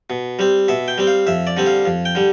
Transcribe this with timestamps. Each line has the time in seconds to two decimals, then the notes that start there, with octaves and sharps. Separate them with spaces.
0.10 B2
0.39 G3 C4
0.68 B2 E5
0.88 G5
0.98 G3 C4
1.07 F5
1.27 F2 E5
1.47 D5
1.57 D3 G3 C4
1.66 F5
1.85 F2
2.05 G5
2.15 D3 G3